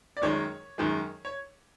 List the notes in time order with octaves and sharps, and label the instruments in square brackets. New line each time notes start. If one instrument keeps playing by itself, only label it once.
[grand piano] D5
F#2 D#3 G#3 C#5
F#2 D#3 G#3
C#5